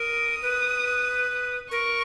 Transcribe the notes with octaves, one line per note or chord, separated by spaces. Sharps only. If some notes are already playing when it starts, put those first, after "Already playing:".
Already playing: A#4 D#6
B4
A#4 C#6